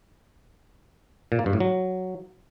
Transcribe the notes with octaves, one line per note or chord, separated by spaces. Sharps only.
A#2
A#3
G2
A2
F#3